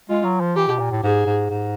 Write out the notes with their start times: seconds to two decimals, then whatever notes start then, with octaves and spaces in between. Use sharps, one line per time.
0.09 G#3 F4
0.24 F#3
0.41 F3
0.56 E3 G4
0.67 B2
0.79 A#2
0.91 A2
1.03 G#2 G#4
1.26 G#2
1.50 G#2